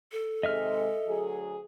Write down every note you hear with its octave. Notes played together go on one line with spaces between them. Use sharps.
A4
C3 D#3 G#3 D#5 E5 F6
D2 F#3 G#4